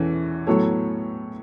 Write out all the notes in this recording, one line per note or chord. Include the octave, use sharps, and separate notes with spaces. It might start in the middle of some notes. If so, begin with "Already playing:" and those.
Already playing: E2 E3 C#4 A4
A2 F#3 B3 A4 C#5